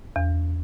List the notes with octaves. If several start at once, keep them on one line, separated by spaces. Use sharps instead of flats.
E2